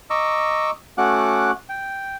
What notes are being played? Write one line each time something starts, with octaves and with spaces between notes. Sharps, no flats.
D#5 A#5 C#6 D6 E6
A3 C#4 F#4 F#5 D6 F#6
G5